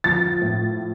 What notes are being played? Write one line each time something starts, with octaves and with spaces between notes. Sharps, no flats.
F3 A6
A2